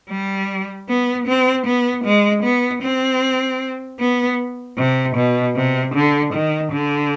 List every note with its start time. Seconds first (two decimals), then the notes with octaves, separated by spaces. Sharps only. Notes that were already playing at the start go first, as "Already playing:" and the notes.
0.10 G3
0.89 B3
1.28 C4
1.66 B3
2.05 G#3
2.44 B3
2.82 C4
4.00 B3
4.78 C3
5.16 B2
5.56 C3
5.95 D3
6.33 D#3
6.72 D3